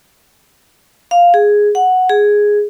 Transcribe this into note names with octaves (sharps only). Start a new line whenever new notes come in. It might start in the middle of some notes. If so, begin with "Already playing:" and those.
F5
G#4
F#5
G#4